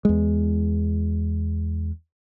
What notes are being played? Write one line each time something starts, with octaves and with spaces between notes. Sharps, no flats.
E2 G#3